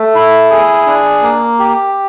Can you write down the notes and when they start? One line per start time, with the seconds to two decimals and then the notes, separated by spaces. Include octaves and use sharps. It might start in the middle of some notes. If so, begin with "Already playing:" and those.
Already playing: A3
0.15 E4
0.50 G#4
0.87 D4
1.23 A#3
1.59 G4